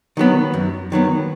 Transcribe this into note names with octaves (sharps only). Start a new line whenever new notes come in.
D#3 F#3 B3
F#2
D#3 F#3 B3